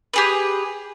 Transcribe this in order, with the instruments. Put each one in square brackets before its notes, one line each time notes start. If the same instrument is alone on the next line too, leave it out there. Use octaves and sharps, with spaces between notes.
[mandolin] G4 G#4 B4